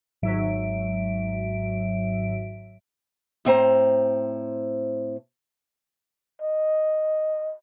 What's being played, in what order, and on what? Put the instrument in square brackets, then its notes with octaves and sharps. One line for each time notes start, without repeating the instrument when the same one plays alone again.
[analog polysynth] G#1 G#2 F#3 E5 D7
[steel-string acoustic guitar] A2 C4 C5 A#5
[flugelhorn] D#5